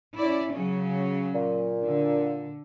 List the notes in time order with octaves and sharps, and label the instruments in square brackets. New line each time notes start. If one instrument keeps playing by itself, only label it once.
[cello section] C#4 E4 D5
C#3 F#3 C#4
[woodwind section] A#2
[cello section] D3